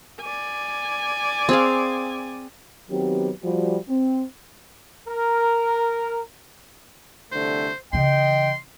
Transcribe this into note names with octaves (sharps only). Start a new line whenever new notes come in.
D5 G#5
C4 G#4 F5
D#3 F#3 B3 C4 G4
F3 G3 F#4
C4
A#4
C2 D3 A3 C5
C#3 E3 D#5 G5 C6